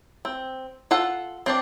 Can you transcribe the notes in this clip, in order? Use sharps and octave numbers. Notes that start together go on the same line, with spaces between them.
C4
F4 A4 F#5
C4 D4 D5